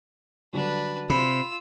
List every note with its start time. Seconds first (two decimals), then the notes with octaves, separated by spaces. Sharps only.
0.53 D3 F#3 G3 D4 B4
1.10 C3 F4 B5 E6